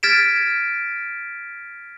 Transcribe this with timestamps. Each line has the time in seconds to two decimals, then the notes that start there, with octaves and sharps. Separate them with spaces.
0.03 F6 G#6 A6 B6 D7 E7